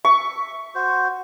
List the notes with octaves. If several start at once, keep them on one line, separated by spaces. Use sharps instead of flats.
E5 C#6
F#4 C5